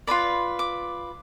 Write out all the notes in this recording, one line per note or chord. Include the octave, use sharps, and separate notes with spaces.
F4 B4 D5 B5
D6